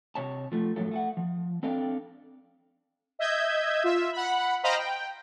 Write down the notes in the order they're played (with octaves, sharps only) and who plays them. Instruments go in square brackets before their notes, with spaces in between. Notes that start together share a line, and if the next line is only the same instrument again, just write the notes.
[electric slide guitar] C3 C#5 A5
F3 A3
F#2 A2 F3 F#3 A4
A3 G#4 F#5
F3
C4 D4 A4 F5 G5
[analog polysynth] D#5 E5 G6 G#6
F4 E5
F#5 B5
C5 D#5 F5 G5 A#5 B5
G5